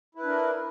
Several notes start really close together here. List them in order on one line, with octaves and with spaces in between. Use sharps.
E4 B4 D4 A#4